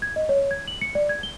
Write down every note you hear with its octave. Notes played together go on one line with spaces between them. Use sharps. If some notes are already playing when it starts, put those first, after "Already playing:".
G#6
D#5
C#5
G#6
F#7
C#7
D5
G#6
G7